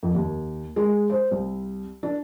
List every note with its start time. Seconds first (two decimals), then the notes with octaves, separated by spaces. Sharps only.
0.03 F2
0.15 D#2
0.76 G#3
1.10 C5
1.31 C2
2.03 D4